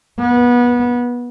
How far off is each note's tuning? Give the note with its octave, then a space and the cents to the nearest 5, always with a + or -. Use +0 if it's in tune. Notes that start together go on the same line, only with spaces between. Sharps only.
B3 -25